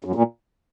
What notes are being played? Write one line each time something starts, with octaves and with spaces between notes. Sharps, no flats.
F#2
A#2